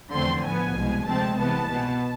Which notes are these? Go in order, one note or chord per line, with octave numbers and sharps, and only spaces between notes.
E2 D3 F3 A3 C4 C6
A2 F3 B3 G#5
C2 B2 G#3
D2 C3 F3 G#3 C4 A5
C2 C3 E3 B3 A5
B2 B3